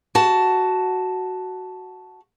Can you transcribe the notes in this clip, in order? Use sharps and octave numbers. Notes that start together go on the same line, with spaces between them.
F#4 A5